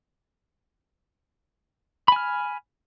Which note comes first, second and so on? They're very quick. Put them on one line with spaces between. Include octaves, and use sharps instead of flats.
B5 G#5 F6